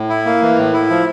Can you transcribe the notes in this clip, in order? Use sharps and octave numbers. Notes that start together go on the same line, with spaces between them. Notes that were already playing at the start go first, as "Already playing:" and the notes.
Already playing: A2
E4
A#3
E3
A2
E4
F3